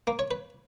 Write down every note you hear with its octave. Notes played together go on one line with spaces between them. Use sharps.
A#3
C#5
B4